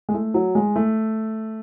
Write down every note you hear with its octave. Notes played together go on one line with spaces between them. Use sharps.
G#3
A3
F#3
G#3
A3